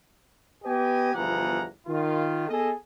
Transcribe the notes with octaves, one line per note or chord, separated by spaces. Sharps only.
B3 G4 B4 D#5 G#5
G1 E2 F3 F#5 A#5
D#3 F4
B3 G#4 A4 D#5